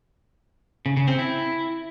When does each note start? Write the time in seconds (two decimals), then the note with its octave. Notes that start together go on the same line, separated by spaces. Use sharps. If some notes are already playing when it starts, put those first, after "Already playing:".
0.86 C#3
0.97 C#3
1.08 C4
1.19 E4